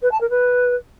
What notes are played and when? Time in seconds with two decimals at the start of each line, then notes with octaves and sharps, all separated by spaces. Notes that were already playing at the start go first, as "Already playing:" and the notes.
0.02 B4
0.11 A5
0.21 A#4
0.30 B4